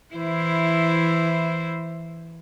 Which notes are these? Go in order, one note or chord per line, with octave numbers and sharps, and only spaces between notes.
E3 E4 C5